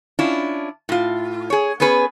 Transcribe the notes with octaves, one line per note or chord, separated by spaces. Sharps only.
C#4 D4 E4 F4
A2 F4
G#4 C#5
B3 C#4 G#4 B4